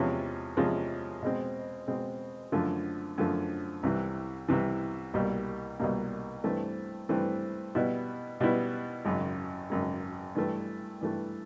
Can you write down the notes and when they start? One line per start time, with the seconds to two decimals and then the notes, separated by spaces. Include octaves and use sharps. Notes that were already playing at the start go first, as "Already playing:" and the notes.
Already playing: E2 C3 F3 G#3 C#4
0.57 E2 C3 F3 G#3 C#4
1.22 B2 G#3 C4
1.88 B2 G#3 C4
2.52 F#2 D3 F3 A3
3.18 F#2 D3 F3 A3
3.83 C2 C3 E3
4.48 C2 C3 E3
5.14 C2 B2 G3 A#3
5.80 C2 B2 G3 A#3
6.44 G2 E3 A3 C4
7.09 G2 E3 A3 C4
7.75 B2 G3 B3 E4
8.40 B2 G3 B3 E4
9.05 G#1 F#2 C#3
9.70 G#1 F#2 C#3
10.35 G2 E3 A3
11.01 G2 E3 A3